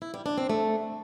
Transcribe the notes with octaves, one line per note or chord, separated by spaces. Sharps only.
E4
G3
D4
C4
A3